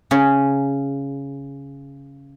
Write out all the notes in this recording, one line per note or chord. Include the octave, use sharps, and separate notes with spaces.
C#3 C#4 G#4